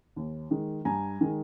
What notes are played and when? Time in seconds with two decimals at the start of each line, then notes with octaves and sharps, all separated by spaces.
0.16 D#2
0.51 D#3 G#3
0.85 G2 G#5 A#5
1.21 D#3 G#3